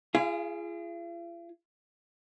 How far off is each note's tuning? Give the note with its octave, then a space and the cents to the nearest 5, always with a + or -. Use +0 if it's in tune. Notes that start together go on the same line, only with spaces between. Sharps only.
F4 -45 G#4 +0 F5 -5